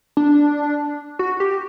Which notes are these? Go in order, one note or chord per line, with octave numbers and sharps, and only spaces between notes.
D4
F#4
G4